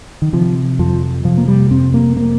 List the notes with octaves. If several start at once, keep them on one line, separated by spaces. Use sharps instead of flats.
D#3
C3 F3
F2 F3
C3 F3
A#3
G3
F2 C4
A#3
C3 A#3